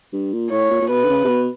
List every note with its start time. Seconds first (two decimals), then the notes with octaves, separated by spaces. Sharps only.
0.13 G2
0.33 A#2
0.51 A2 C#5
0.70 A#2
0.82 A#2
0.89 B2 B4
1.04 D3
1.09 C#3
1.24 C3
1.28 B2